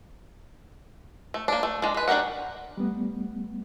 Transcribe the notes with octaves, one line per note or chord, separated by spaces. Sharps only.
A3
A#3 D4
A3
G#3 D4
G#3 B4
D4 F#4 G4 A#4 F#5
G3 A3 B3